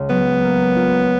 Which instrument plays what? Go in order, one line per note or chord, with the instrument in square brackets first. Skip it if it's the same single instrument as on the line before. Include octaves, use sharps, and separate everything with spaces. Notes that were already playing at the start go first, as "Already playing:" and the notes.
Already playing: [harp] C#2 C#3
[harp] F#3 [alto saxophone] B3
[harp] A#3
F4